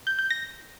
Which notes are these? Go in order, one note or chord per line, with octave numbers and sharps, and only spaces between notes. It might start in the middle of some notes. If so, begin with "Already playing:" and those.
G6
G6
A#6